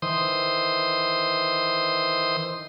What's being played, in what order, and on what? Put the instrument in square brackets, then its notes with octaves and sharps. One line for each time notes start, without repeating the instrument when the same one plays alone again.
[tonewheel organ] D#3 E3 C5 C6 D#6